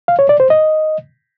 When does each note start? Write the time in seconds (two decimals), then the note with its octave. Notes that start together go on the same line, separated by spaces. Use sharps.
0.08 F5
0.19 C#5
0.29 D5
0.40 C5
0.50 D#5